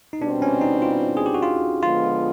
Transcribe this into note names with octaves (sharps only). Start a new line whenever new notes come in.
D#4
B2 G3 C4 D4
C#4
D#4
F4
G#4
G4
F#4
F4
D3 F3 G#3 B3 F4